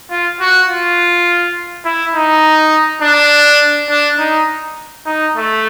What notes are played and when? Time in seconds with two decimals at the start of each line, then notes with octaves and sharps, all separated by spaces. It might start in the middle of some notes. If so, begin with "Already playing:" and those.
0.10 F4
0.40 F#4
0.68 F4
1.85 E4
2.15 D#4
3.02 D4
3.90 D4
4.19 D#4
5.06 D#4
5.36 A3